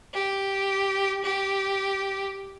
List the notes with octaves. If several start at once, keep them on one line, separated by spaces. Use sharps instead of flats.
G4
G4